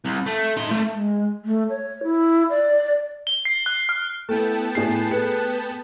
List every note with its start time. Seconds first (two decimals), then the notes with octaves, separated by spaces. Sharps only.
0.05 C2
0.26 A3
0.57 D#4 C6
0.71 A3
0.92 G#3
1.45 A3
1.70 C#5
2.03 E4
2.50 D5
3.27 G7
3.45 C7
3.66 F#6
3.89 F6
4.29 A3 B3 E4 G5 A5
4.75 A2 G#4 G#5 C7
5.11 A3 G#4 B4 C#7